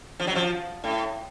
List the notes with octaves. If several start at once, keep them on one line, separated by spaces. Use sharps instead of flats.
F3
F#3
F3
A2